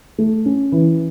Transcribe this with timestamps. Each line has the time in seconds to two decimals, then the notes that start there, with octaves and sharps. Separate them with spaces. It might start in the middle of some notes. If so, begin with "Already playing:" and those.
0.18 A3
0.46 C#4
0.72 E3